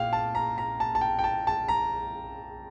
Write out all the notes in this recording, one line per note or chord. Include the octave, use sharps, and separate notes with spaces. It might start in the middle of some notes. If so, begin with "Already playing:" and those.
Already playing: A#2 F5 G5
A5
A#5
A#5
A5
A5
G5
G5
A5
A5
A#5